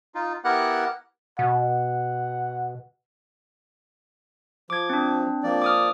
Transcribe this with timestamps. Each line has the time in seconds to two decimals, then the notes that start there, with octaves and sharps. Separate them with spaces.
0.15 D#4 F4
0.44 B3 E4 G4 A#4 F#5 F#6
1.39 B2 F#5
4.70 F3 D6 G#6
4.90 C4 D4
5.43 F3 A#3 D5
5.62 D6 D#6 F6